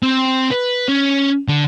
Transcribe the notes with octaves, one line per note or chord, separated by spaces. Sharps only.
C4
B4
C#4
D3